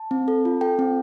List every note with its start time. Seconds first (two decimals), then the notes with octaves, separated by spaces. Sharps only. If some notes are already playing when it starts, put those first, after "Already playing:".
Already playing: A5
0.11 C4
0.28 A4
0.45 F4
0.61 A4 G5
0.79 C4